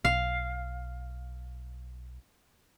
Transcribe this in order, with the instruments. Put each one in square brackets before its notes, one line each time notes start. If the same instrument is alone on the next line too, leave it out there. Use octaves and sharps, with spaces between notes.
[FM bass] B1 [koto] F5